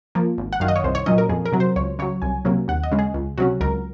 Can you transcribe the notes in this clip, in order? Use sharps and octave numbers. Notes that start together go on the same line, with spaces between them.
F3 A#3
G#1
F#5
F#2 D#3 F5
D#5
C#5
C2 C5
C#5
A#2 F#3 C#4 D#5
A#4
F2 G#4
A#4
C3 F#3
C5
C#2 C#5
C#3 F#3 C#5
C2 G#5
C3 F#3 A#3 C#4
D#2 F#5
D#5
C#3 G#3 C#4
G#4
C#2
C3 F#3 C#4 F#4
C#2 A#4